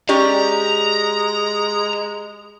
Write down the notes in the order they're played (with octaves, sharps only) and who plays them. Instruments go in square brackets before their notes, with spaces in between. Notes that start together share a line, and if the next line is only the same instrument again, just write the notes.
[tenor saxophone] G#3 [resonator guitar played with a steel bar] C#4 G4 D5 [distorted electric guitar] A#5